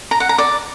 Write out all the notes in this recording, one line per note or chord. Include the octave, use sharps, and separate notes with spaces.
A#5
F#5
A#5
D5